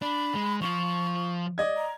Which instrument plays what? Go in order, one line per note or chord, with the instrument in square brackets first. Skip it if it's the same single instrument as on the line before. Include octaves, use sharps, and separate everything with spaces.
[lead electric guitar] D4 [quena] B5
[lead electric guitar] G#3
[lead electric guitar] F3 F4 [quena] C#6
[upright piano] D5 D#5 G#6
[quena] A#5